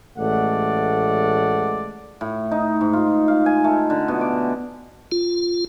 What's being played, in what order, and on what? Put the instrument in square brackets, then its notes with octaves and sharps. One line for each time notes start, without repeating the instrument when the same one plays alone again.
[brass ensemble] A1 G#3 A3 D5 F#5
[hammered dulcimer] A2
D#4
G#2
F4
F5
G#5
A3
D3
B2
D6
[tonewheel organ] F4